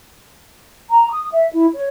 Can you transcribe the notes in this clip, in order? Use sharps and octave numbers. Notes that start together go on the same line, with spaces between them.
A#5
D#6
E5
E4
C#5